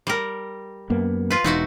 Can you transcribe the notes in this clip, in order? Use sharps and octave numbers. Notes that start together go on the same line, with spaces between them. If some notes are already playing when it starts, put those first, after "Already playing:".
G3 A#4
F#2 A#3 B3
F4 B4
E1 D#4 E4 F#4